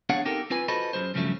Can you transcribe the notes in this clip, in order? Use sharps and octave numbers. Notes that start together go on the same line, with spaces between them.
B3 D4 G#4 C#5 F5 F#5
C4 D#4 G4 A4 A#4
C4 F4 B4 G#5
F4 F#4 A4 B4 C5 D#5
F#2 G#3 G#4 C5
G2 C#3 F3 F#3 A3